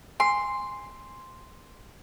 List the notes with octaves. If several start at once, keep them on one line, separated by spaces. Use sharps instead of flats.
G#5 C6